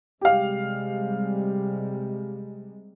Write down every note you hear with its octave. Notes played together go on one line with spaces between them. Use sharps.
C3 G3 G#3 G4 F5